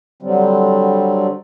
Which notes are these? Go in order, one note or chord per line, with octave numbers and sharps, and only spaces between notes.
D3 F#3 G3 C4